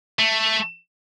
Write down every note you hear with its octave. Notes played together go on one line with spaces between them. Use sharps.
A3